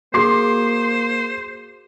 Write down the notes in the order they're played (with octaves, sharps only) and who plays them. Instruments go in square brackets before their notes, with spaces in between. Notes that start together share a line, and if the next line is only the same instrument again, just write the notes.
[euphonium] A#3 [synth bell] F#4 G#4 [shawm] C5 [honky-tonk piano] C6 D6 C7